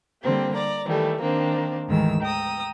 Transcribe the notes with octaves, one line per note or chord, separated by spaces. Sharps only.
D3 G3 A#3 C4 G4
D5 A#5
D#3 E3 G3 A3
D#3 A#3 C4 D4
D2 G#2 D#3 E3 E6
G5 A#5 D#6 E6